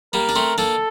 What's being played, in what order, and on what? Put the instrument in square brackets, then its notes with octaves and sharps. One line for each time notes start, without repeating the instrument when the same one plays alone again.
[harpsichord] G3 A#3 [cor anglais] A#4
[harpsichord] D4
A3 C4
[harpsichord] A#3 D4 [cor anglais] A4